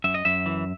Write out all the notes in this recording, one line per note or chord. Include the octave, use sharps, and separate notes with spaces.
F#2 E5
D#5
F#2 E5
E3